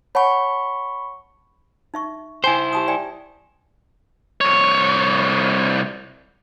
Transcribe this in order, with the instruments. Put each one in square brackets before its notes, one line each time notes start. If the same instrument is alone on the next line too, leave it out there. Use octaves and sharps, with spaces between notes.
[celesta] C#5 F#5 A5 [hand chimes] B5 C#6
[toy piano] D#4 E5 C#6
[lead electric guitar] E4 C5 [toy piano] G5 G#5 D6
[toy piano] G4 A5 D#6
D5 G5 G#5
[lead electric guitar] C2 C#5